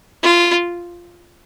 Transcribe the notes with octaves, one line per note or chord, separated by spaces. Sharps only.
F4